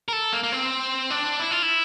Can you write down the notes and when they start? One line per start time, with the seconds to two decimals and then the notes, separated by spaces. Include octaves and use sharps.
0.08 A#4
0.13 A4
0.33 A#3
0.43 A#3
0.52 C4
1.10 D4
1.40 E4
1.51 F4
1.62 E4